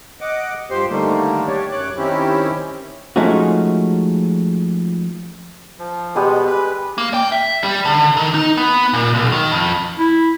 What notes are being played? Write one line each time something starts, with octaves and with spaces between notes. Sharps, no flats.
D#5 F#5 D6
G2 F3 G4 C5 C6
D3 D#3 G3 A3 A#3
D4 G4 C#5 D5
F#2 C#5 D6 F#6
D#3 C4 C#4 E4 G4
F3 G#3 A3 C#4 D#4 F#4
F3
B2 G3 G#3 B3 D#5
B4
A#3
G5
E5
G3
D3
D#3
D#4
B3
A#2
B1
D#3
F2
E4